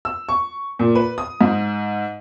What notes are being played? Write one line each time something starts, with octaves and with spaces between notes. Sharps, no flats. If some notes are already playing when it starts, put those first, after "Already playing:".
E6
C#6
A#2
B4
D#6
G#2